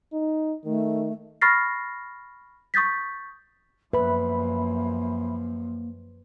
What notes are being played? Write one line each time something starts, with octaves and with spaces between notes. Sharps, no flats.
D#4
D#3 A3
B5 C#6 F6 A6 A#6 C7
C#6 D#6 G6 A6 B6
F#2 F3 A#3 B4 E5 B5